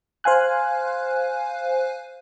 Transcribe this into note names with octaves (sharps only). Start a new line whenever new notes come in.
C5 F5 G#5 F#6